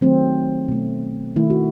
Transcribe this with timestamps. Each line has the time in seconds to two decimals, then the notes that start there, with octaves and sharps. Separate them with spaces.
0.01 D#3 F#3 A3 C4
0.68 B2 A3
1.36 D#3 A3 E4
1.50 F#4